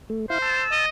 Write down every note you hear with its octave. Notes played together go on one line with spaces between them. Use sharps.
A3
E4 C5 F5
A5 E6
D#5